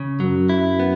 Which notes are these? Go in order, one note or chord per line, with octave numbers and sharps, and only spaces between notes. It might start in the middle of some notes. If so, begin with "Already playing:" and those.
Already playing: C#3
F#2 F#3
E4
B3